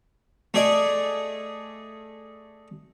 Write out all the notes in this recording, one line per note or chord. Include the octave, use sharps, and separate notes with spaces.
A3 G#4 D5 D#5